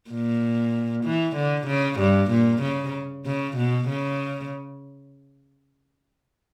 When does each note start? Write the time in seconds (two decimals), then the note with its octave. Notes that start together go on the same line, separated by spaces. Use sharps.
0.10 A#2
1.05 E3
1.36 D3
1.67 C#3
2.00 G2
2.31 A#2
2.62 C#3
3.25 C#3
3.57 B2
3.88 C#3